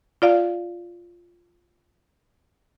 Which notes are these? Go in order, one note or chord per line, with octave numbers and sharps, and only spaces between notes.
F4 D5 F5